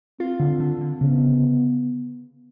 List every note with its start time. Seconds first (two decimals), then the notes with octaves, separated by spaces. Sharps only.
0.20 C4 F4
0.40 D3
0.60 D3
0.81 D3
1.01 C#3 B3